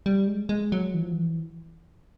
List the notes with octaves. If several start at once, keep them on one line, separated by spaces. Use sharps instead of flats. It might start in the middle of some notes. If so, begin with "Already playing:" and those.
G3
G#3
G#3
F#3
E3
F3
E3